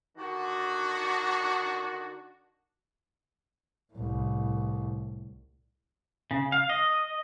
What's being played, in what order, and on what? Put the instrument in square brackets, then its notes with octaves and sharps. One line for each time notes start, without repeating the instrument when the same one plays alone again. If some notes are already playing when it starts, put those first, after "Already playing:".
[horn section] D3 D#3 D4 F#4
[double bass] C2 A2
[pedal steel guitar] C#3
F5
D#5